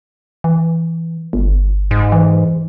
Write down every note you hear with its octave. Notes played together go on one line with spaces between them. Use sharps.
E3
G1
G#2
E3